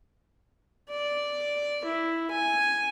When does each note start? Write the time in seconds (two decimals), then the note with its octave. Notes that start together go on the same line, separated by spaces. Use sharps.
0.89 D5
1.84 E4
2.30 G#5